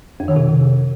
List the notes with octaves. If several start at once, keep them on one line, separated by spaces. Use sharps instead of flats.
F2
D#3
C3